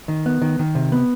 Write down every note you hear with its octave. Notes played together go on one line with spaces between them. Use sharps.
D#3
B3
D#3
D#3
C3
B3